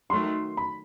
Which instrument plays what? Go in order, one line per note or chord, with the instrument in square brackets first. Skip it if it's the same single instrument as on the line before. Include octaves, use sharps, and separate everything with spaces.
[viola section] D#3 F#3 A3 [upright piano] C6
[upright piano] B5